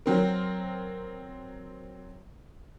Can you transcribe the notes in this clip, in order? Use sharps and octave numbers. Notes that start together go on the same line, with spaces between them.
F#3 C4 A#4